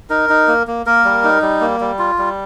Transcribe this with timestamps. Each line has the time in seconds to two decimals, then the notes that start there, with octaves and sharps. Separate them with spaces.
0.10 D#4 A#4
0.29 D#4
0.48 A#3
0.67 A#3
0.86 A#3 A#4
1.05 G3
1.24 D#4
1.42 G3
1.61 A#3
1.80 G3
1.99 F4
2.18 G3